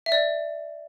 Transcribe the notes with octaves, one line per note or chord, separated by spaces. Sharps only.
E5
D5